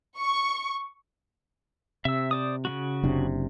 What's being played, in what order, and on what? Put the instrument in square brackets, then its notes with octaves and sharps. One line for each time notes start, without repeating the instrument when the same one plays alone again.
[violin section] C#6
[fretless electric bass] C3 [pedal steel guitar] E5 E6
[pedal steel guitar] C5 D5 D#6
C#3 G3 F#4
[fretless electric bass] F#1 C3 D4